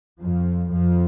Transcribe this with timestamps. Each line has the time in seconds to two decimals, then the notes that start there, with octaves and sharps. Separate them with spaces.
0.20 F2 F3
0.71 F2 F3